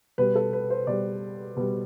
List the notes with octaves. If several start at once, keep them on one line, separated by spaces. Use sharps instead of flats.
B2 G3 B4
A4
B4
C5
B2 G3 D5
B2 G3